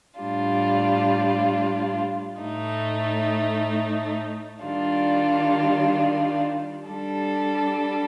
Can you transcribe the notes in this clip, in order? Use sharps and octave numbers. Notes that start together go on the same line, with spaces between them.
A2 G3 D4 F4
A2 A3 D#4
D#3 G3 D4 F4
G3 D4 A4